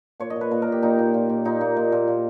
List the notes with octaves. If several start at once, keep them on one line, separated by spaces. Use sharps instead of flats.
A#2 C#5
D#5
A#2
B4
A#2 B4
A#4
A#2 G4
A#2 D#4
A#2
A#2
A#2
A#2 D#4
A#2
A#2
A#2
A#2